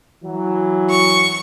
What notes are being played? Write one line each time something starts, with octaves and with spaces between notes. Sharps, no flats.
E3 F#3
C#6